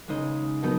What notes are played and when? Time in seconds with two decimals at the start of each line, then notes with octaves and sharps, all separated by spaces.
0.08 C#3 G#3 D#4 D#5
0.62 B2 F#3 B3 D#4